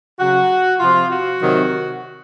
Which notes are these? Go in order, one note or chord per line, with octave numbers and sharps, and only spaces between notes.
C#3 F#3 F#4
C3 F3 F4
F#4
C3 D#3 F#3